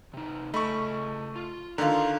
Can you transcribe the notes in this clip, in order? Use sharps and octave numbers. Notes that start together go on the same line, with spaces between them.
C3 D#4
C#3 A3 D#5 B5 C#6
F4
D3 D#3 F4 A#5 C6